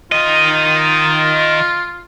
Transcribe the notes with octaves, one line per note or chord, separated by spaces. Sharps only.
D#3 F4 D#5